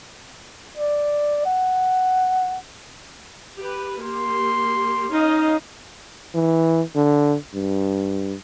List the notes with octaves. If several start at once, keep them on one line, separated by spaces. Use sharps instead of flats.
D5
F#5
G4 B4
A#3 G4 C6
C#4 D#4 D#5 F5
E3
D3
G2